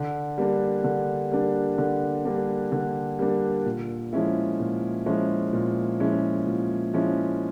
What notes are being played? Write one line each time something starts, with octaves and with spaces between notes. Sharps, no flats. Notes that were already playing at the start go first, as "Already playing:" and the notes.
Already playing: D3
G3 A#3 D4
D3
G3 A#3 D4
D3
G3 A#3 D4
D3
G3 A#3 D4
A#2
F3 G#3 C#4 E4
A#2
F3 G#3 C#4 E4
A#2
F3 G#3 C#4 E4
A#2
F3 G#3 C#4 E4